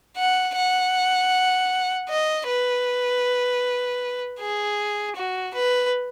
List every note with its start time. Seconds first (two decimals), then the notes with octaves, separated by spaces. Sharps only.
0.17 F#5
0.55 F#5
2.09 D#5
2.47 B4
4.40 G#4
5.16 F#4
5.54 B4